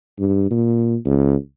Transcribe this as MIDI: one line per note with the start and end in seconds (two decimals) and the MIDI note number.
0.19 0.47 43
0.51 0.96 46
1.06 1.36 37